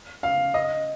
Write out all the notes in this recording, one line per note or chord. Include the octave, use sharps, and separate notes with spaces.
F5
D#5